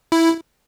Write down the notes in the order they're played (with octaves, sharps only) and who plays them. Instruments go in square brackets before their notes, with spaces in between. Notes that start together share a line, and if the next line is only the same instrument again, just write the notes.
[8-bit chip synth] E4